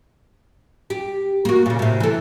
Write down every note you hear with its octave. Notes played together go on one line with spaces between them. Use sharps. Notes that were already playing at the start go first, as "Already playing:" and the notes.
G4
A#3 F#4
A#2 C#3
A2 C3
E3 A4